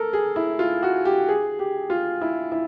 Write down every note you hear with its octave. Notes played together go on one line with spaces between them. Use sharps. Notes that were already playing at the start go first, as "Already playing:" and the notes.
Already playing: A4 A#4
G#4
E4
F4
F#4
G4
G#4
G4
F4
E4
E4